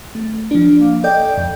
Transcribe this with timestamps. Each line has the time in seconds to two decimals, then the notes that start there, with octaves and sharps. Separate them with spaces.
0.15 A3
0.51 F3 D4
0.78 A#3
1.04 A4 D5 D#5 G5
1.38 F2